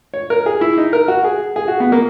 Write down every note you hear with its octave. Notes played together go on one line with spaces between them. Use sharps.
C#5
A#4
G#4
E4
D#4
A#4
F#4
G#4
G#4
F#4
B3
A#3